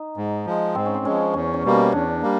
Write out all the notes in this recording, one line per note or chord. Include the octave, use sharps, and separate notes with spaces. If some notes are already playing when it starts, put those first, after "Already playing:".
Already playing: D#4
G#2
F3 G#3
G#2 C4
C#4
C4
F3 G#3 C#4
E2 C#4
C#4
B2 G3 A#3
C#4
E2 D4
G3 A#3